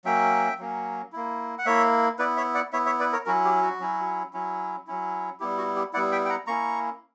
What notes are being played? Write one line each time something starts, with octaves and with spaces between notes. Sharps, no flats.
F#3 A#3 C#4 E5 G5
F#3 A#3 C#4
A#3 E4
F#5
A#3 E4 C#5 E5
B3 E4 B4 D5
C#5 E5
D5 F#5
B3 E4 C#5 E5
C#5 E5
B4 D5
A#4 C#5
F#3 C#4 E4 F#4 A#4
G4
F#4
F#3 C#4 E4
F#3 C#4 E4
F#3 C#4 E4
G3 B3 E4 G4
F#4
G4
G3 B3 E4 D5 F#5
E5 G5
G5
F#5 A#5
A#3 C#4 E4 A#5 C#6